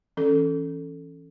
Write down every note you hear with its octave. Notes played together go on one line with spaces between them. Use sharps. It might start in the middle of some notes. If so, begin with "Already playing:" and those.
E3 C#4 A4